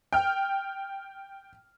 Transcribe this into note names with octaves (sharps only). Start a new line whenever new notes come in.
G5 F6